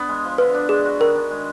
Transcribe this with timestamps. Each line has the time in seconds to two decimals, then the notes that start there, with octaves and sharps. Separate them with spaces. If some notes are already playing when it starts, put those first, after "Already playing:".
Already playing: B3 D4
0.09 G#3
0.24 F3
0.38 D3 B4
0.54 D4
0.69 G#3 G#4
0.85 F#4
1.00 D#3 A#4
1.16 D4
1.31 G#3